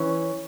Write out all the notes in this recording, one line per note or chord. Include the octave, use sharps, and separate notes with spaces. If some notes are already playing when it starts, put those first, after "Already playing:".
Already playing: E3 C#4